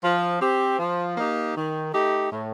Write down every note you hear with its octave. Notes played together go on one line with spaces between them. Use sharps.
F3
C4 G4
F3
A#3 D#4 G4
D#3
A3 D#4 G4
A2